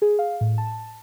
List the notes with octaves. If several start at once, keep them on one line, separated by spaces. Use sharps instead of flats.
G#4
F5
A2
A5